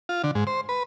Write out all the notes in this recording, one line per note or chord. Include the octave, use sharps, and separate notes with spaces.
F4
D3
G#2
C5
B4